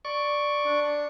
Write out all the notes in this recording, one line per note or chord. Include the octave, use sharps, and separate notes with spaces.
D5 C#6
D4